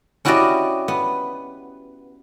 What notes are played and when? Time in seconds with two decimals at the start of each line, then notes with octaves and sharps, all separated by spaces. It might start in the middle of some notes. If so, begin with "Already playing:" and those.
0.25 C#4 E4 F#4 G4 D5 D#5
0.88 B3